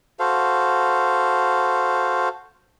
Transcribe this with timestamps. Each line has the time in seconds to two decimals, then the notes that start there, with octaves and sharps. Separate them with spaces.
0.20 F#4 A4 C5 F5